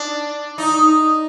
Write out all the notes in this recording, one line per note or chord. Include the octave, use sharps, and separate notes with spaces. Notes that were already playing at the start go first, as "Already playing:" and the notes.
Already playing: D4
D#4